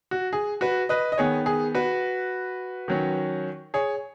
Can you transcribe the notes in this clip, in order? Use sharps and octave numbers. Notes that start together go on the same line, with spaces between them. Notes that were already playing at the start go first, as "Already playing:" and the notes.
F#4
G#4
F#4 B4
B4 D#5
D#5
D#3 B3 G#4 C#5
G#4
F#4 B4
D#3 F#3 C#4
G#4 C#5